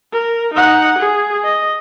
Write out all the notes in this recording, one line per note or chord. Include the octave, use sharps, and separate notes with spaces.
A#4
D#4 F#5
G#4
D#5